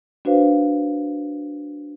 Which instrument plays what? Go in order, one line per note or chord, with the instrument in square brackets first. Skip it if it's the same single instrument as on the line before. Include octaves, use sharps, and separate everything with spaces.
[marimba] D4 F#4 B4 C5 F5